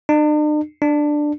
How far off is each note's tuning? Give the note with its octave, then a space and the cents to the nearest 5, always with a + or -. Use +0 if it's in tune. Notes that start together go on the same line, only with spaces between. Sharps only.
D4 +45
D4 +10